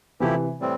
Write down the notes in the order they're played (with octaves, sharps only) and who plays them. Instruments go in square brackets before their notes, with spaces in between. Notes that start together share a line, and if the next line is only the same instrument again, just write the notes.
[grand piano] C3 E3 [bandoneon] F3 A3 E4 G4
[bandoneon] A2 E3 G3 C4